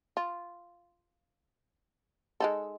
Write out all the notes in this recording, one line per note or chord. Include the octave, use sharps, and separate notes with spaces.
F4
G#3 D#4 A4